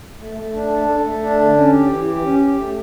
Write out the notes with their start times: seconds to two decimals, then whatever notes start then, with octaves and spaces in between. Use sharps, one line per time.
0.20 A3
0.38 A3
0.54 D4
0.71 A4
0.88 A4
1.05 A3
1.22 D4
1.40 D3
1.57 C#4
1.73 G4
1.90 E3
2.07 G4
2.24 C#4
2.41 G4
2.58 A3